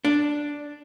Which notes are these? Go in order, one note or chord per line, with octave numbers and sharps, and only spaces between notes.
D4